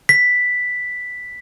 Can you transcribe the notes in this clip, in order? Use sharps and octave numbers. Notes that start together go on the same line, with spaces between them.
B6